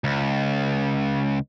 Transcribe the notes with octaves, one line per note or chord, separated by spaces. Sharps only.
C#2